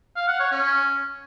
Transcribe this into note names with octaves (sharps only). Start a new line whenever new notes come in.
F5
F#5
C#5
C#4